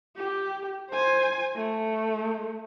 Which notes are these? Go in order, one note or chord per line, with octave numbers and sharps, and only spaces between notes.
G4
C5 G#5
A3